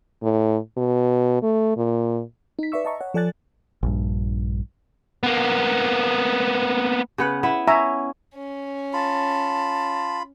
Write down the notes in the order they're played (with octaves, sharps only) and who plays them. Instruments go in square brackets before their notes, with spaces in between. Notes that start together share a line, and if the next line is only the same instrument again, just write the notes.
[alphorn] A2
B2
A3
A#2
[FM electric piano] D#4 B6
B4 D5 E5 C#6 E6
D#5 E5 A5 A#5 C#6
C#5 F#5
F3 A4 D5 G#5 F#6 A6
[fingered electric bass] A#1 G2
[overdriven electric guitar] A#3 B3
[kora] C#3 B3 F#5
B3 E4 E5
[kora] C#4 [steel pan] E5 A#5
[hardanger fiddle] C#4
[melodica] F4 B5 [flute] A5